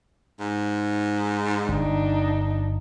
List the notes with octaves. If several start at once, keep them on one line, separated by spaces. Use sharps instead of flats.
G#2
G1 G2 D4 D#4